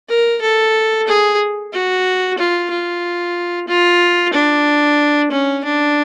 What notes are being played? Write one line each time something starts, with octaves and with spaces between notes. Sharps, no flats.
A#4
A4
G#4
F#4
F4
F4
F4
D4
C#4
D4